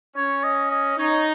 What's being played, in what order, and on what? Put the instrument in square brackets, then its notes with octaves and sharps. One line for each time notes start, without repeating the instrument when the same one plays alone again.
[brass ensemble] C#4 [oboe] C#5
[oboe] D#5
D#5
[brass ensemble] D#4 [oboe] C#5